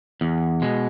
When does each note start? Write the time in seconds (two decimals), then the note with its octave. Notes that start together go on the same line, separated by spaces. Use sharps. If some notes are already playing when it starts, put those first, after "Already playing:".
0.21 E2
0.62 B2 G#3